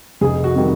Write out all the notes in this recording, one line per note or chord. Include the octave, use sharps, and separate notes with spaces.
F1 G#4
F#4
C3 D#3 G3